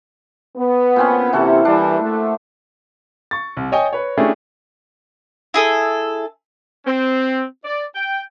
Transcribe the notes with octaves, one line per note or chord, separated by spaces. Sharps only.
B3
A#2 C4 C#4
C3 E3 F#4 A4
E3 G3 D4
A3
C#6 A6
C2
C#5 D#5 G5 G#5
B4 C#5
A3 C#4 D4 E4 G4 G#4
E4 G#4 A4
C4
D5
G5